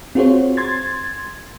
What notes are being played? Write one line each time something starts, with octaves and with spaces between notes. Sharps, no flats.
C4 F4 F#4 G#4 C5 C#5
C6 G#6 A6